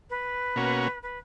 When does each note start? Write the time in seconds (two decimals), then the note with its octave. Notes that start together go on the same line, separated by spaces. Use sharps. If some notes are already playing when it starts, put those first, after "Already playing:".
0.10 B4
0.56 B2 A#3 C#4 F#4
1.02 B4